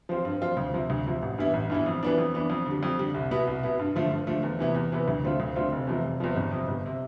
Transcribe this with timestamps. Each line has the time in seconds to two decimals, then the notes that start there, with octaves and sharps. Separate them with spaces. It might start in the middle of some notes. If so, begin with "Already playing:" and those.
0.09 F3 C4 F4
0.25 G2
0.42 F3 C4 F4
0.57 D2
0.74 C3 F3
0.90 D2
1.06 C3 F3
1.22 A1
1.38 G2 E3 B3 E4
1.54 A1
1.70 G2 E3 B3 E4
1.86 F2
2.03 E3 B3 D4
2.18 F2
2.34 E3 B3 D4
2.50 F2
2.66 D3 G3
2.83 F2
2.99 D3 G3
3.14 C2
3.31 B2 B3 E4
3.47 C2
3.63 B2 B3 E4
3.79 G2
3.96 D3 F3 A3
4.11 G2
4.27 D3 F3 A3
4.43 E2
4.59 C3 E3 B3 E4
4.75 E2
4.92 C3 E3 B3 E4
5.08 D2
5.24 D3 A3 C4 F4
5.40 D2
5.55 D3 A3 C4 F4
5.72 F1
5.87 E2 C3 F3
6.04 F1
6.20 E2 C3 F3
6.36 G1
6.51 F2 C3
6.68 G1
6.86 C3